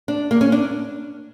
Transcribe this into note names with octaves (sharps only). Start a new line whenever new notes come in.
D4
A#3
C#4
D4